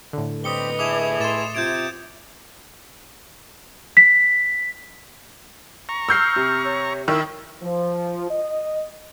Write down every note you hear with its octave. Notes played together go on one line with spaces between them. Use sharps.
A2 D3
G3 C4 G4 B4 D#5 D#6 C#7 G7
A3 E4 G#4 D6 D#6 F7
A2 C6 D6 A6 E7
C3 F4 G6 G#6 D7
B6
A#5 C#6
E6 F6 G6 C7
C3
C#5
D#3 E4
F3
D#5